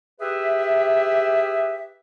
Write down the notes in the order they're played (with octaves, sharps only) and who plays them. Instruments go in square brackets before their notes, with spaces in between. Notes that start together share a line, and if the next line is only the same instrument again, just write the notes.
[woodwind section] G4 G#4 B4 E5